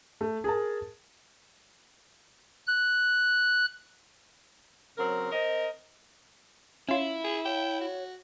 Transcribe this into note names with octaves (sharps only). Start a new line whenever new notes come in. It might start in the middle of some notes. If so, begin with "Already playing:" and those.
A3
G#4 A#4 A5
F#6
C#3 F#3 C4 A#4
C4 A#4 D#5
C#4 E4 F4
G#4
C#5 G5
F#4